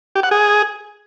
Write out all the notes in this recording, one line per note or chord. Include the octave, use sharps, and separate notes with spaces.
G4
F#5
G#4